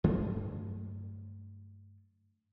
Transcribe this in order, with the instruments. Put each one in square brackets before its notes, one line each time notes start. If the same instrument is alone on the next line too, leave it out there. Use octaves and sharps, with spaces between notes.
[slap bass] G2 D3 F#3 A3